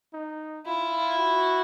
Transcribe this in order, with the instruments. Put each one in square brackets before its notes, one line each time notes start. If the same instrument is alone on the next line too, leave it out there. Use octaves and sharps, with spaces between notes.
[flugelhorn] D#4
[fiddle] E4 [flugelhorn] F4
[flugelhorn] F#4